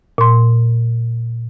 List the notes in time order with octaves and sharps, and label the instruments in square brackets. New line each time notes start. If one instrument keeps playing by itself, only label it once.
[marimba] A#2 C6